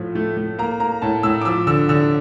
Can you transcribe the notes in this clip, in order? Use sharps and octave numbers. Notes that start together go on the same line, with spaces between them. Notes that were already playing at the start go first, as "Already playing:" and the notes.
Already playing: A2 F3 A3
A3
A3
A#3 A#5
A#3 A#5
A2 A5
A2 E6
D6
F3 E6
D3 E6
D3 E6